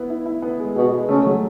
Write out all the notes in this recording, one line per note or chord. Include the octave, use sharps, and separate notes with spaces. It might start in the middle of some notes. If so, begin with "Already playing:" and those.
Already playing: B3 E4
E4
E4
B3
G#3
B2 B3
G#3
C#3 A3
F#3